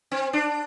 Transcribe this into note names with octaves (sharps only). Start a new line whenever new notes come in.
C4
D4